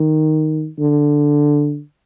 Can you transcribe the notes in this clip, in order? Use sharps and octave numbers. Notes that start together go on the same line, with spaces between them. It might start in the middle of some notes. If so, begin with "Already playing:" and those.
Already playing: D#3
D3